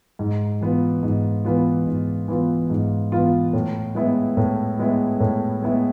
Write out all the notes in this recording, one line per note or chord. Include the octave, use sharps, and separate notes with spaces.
G#2
E3 B3 F4
G#2
E3 B3 F4
G#2
E3 B3 F4
G#2
E3 B3 F4
A2
G#3 B3 E4
A2
G#3 B3 E4
A2
G#3 B3 E4